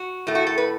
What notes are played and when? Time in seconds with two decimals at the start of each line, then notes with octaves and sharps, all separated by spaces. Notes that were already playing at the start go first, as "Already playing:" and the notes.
Already playing: F#4
0.27 A2 A3
0.35 F#4
0.47 A4
0.58 B4